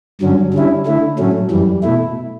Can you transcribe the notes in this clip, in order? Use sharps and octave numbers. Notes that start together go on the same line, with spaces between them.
G2 D3 F#3 C#4
D3 G3 C#4 E4
D3 A3 E4
A2 F#3 A3 C#4
F#2 E3 G3
B2 A3 E4